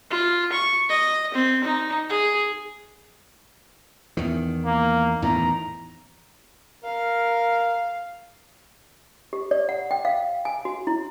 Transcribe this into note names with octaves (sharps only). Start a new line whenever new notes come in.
F4
C#6
D#5
C4
D#4
G#4
E2 D#3
A#3
E2 A2 D#3 A#5
A#4 F5
G4
D5
F#5
G5
F5
G#5
F#4
E4